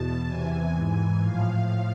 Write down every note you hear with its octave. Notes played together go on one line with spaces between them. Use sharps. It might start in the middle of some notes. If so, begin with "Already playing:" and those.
Already playing: E2 B2 A5
E2 C3 E3 G#5
G#2 E3
A2 F3 F5